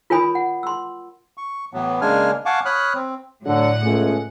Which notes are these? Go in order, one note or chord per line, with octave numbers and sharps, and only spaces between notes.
F4 A#4 C#5 G#5 B5 D#6
F#5
C6 E6
C#6
A2 E3 F#3 B3
C#3 G#3 A#3 D4 G#5 F6
F5 F#5 G#5 A5 C#6 D6
C#5 B5 D#6 F6 F#6
C4
A2 D3 F#3 F#5
C#2 B2 A3 G#4